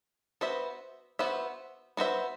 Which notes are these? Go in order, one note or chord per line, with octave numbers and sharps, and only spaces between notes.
B3 F#4 C5 E5
B3 F#4 C5 E5
B3 F#4 C5 E5